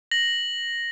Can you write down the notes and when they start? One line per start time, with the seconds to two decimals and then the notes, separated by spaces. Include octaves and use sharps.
0.11 A#6 F#7